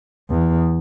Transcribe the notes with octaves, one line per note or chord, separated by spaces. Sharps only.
E2